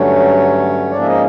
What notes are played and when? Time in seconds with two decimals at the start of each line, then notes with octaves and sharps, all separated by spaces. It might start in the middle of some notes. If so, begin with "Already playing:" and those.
Already playing: G2 D3 F#3 A3 C#4 C#5
0.91 G#2 F3 A#3 C#4 D4 D5
1.01 E5
1.07 D#4 D#5